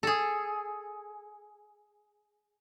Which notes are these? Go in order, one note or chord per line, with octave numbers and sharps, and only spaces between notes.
G#4 A4